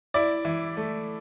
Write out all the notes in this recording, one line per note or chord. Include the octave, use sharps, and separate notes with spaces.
E4 D5
E3
A3